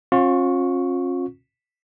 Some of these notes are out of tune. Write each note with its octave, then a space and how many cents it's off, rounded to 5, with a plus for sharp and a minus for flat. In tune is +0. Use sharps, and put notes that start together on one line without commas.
C#4 -45 F4 +35 C#6 +0